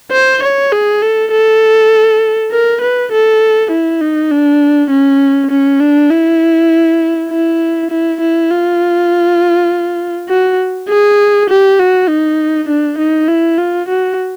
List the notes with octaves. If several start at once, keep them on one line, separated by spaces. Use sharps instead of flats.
C5
C#5
G#4
A4
A4
A#4
B4
A4
E4
D#4
D4
C#4
C#4
D4
E4
E4
E4
E4
F4
F#4
G#4
G4
F#4
D#4
D4
D#4
E4
F4
F#4